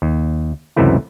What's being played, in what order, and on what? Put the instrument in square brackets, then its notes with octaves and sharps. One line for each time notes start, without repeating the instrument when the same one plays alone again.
[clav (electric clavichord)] D#2
C#2 F#2 C3 E3 A3 E4